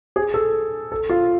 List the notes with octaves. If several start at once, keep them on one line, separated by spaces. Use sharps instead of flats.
G#4
A4
A4
F4